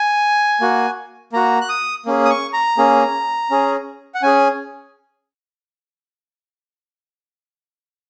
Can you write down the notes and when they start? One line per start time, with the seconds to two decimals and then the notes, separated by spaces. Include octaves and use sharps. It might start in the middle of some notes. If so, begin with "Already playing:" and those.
Already playing: G#5
0.61 A#3 F#4
1.33 A#3 F#4 A#5
1.61 F#6
1.69 D#6
2.06 A#3 C#4 G#4
2.25 D#6
2.30 C#6
2.53 A#5
2.78 A#3 C#4 G#4
3.51 C#4 G#4
4.15 F#5
4.22 C#4 G#4 G#5